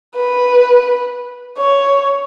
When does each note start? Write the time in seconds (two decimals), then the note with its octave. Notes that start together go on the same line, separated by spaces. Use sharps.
0.16 B4
1.57 C#5